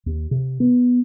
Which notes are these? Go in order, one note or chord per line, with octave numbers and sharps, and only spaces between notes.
D#2
C3
B3